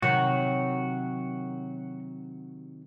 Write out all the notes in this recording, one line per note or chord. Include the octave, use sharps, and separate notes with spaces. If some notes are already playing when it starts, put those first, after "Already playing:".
C3 D#3 F#3 F#4